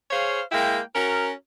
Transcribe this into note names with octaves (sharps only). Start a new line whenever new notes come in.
G#4 C5 C#5 F5
G#3 A#3 E4 G5
C#4 F#4 A#4